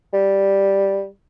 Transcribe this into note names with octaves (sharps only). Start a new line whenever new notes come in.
G3